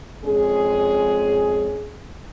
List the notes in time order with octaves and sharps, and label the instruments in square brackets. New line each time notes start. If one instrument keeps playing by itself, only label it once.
[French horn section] F2 G#3 C#4 G#4